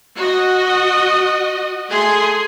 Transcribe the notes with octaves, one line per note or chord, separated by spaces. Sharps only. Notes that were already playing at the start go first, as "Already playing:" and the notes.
F#4 D#5
A3 G#4 C6